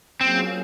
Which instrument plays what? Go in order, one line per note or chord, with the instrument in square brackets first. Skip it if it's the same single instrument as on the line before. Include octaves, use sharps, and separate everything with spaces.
[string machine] F#3 A#3 C#4 F4 G#4 [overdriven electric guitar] C4